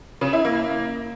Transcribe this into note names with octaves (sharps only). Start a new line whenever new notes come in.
C#3
E4
A#3